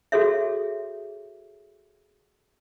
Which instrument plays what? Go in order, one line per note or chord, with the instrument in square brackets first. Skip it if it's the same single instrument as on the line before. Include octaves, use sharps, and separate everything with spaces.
[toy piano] F#4 G#4 A4 C#5 E5